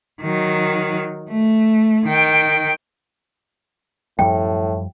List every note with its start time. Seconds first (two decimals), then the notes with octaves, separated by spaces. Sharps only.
0.22 D#3 F#3
1.30 A3
2.05 D#3 G5
4.19 F#2 A2 F3 G3 G5